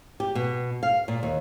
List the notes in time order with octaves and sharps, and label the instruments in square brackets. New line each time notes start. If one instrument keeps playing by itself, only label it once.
[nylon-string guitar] G4
B2
F5
A#2
D#2